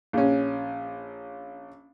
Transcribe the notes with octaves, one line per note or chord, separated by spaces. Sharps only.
A#1 C#4